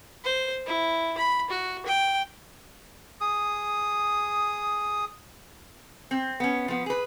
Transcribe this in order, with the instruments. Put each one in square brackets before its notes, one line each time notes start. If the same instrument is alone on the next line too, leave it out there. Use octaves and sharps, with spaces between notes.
[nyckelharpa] C5
E4
B5
F#4
G5
[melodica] G#4 D#6
[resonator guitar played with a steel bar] C4
B3 C#4
F3 B3
G#4 B4